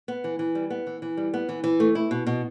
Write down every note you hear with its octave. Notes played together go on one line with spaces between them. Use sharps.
B3
E3
E3
G3
B3
E3
E3
G3
B3
E3
E3
A3
E4
B2
B2